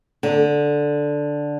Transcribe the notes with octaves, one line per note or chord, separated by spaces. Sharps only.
D3